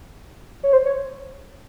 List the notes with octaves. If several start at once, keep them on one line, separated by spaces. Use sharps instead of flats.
C#5
C5
C#5